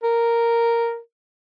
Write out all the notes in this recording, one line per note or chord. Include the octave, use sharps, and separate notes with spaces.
A#4